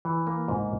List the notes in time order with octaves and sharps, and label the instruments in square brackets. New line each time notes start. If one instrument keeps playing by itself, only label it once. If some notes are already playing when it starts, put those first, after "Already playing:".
[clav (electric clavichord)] E3
A#3
G#2